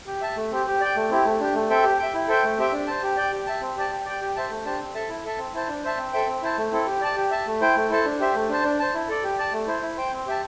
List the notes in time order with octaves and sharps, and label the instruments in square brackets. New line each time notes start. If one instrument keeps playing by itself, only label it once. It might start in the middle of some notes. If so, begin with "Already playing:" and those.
[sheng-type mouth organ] G4
E5 A5
A3
C4 G4
G4
D5 G5
A3
C4 E4 G4
A3
D4 G4
A3
C4 A4 E5 G5
G4
E5 G5
E4
A4 C5 E5 G5
A3
C4 G4 E5 G5
D4
C5 A5
G4
D5 G5
G4
E5 A5
C4
G4 D5 A5
G4
D5 G5
G4
C5 E5 A5
A3
D4 G4 C5 A5
C4
A4 E5 A5
E4
A4 E5 A5
C4
E4 C5 A5
D4
C5 E5 A5
C4
A4 C5 E5 G5
C4
E4 C5 A5
A3
C4 E4 A4
G4
D5 A5
G4
E5 A5
A3
E4 C5 G5
A3
E4 A4 C5 A5
D4
G4 C5 E5
A3
D4 C5 A5
D4
C5 A5
E4
A4 D5
G4
D5 A5
A3
E4 C5
E4
C5 G5
C4
G4 E5 A5